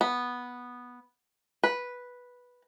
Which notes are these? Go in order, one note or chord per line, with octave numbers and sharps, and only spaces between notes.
B3
B4